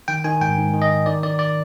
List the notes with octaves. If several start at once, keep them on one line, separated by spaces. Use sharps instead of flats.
D#3 G5
D#3 G#5
G#2 G5
G#2
D#3
D#5
D#3
D#3 D5
D#3 D5
D5